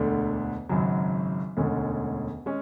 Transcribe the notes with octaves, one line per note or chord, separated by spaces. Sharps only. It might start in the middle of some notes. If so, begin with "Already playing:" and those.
Already playing: E1 D2 D3 A3 D4
G#1 F#2 C#3 F#3
E1 D2 D3 G#3 C#4
G#3 C#4